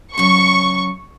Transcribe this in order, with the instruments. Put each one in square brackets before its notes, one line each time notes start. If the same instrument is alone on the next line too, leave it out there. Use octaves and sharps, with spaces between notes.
[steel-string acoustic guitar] C#3 F#3 [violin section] C#6